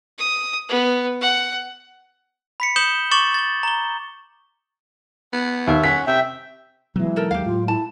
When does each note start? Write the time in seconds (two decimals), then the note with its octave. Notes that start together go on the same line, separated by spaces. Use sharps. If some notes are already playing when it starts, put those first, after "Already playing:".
0.18 D#6
0.69 B3
1.21 F#5
2.60 B5 B6 C#7
2.76 D#6 G6 C#7 E7 F#7 G7
3.11 C#6 D6 A6 E7 F#7
3.34 A6 G7
3.63 A#5 G7
5.33 B3
5.67 D#2 E5
5.84 C#4 F#5 B6
6.07 C3 E5 G5
6.96 B2 E3 F#3 G#3
7.16 D#4 A4 A#4
7.31 D#2 G4 F5
7.46 A2 F4
7.68 E4 A5